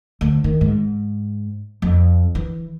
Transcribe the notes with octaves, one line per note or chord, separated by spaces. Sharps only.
D2
D#3
G#2
F2
E3